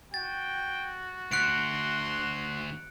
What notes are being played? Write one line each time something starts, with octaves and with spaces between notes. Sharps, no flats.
F#4 G5 A6
D2 C6 F#6 C#7 D7